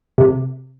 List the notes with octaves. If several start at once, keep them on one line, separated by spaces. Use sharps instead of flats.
C3